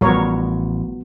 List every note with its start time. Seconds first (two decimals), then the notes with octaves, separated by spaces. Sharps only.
0.01 A1 F3 G3 B3 F#4 A#4 C#5